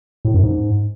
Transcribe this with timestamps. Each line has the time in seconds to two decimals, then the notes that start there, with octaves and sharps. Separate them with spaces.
0.25 A2
0.34 F#2
0.44 G#2